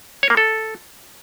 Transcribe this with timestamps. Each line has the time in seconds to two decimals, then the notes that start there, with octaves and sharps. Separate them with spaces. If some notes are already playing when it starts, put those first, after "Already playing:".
0.23 C#5
0.30 A#3
0.37 A4